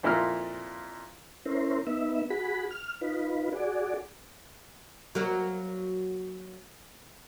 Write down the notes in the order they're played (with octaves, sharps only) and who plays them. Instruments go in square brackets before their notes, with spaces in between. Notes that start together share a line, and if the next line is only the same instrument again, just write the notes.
[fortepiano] F2 A#2 E4 F4 A#4 F6
[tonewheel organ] C#4 E4 A#4 C5
B3 D#4 E5
F#4 G#4 B5
F6
D#4 F4 B4
F#4 G#4 D5
[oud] F#3 A#3 F#4